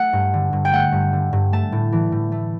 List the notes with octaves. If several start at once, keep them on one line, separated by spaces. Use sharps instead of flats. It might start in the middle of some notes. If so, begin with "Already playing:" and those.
Already playing: A3 F#5
G2
D3
G2
G5
A3 F#5
G2
D3
G2
A3 A5
A2
E3
A2
A3